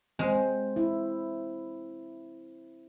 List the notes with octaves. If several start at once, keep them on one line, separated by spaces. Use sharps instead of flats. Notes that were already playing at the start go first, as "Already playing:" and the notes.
G#3 C4 C5
E4